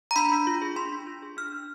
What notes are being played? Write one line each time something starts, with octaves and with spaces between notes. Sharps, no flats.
A#5
D4 B5
D4
F4
G#4
D4 C6
D4
F4
G#4
D4 F6
D4